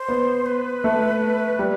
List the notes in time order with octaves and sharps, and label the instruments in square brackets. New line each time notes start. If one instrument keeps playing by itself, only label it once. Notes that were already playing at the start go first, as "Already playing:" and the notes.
Already playing: [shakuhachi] C5
[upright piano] B3
[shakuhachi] B4
[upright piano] A3
G3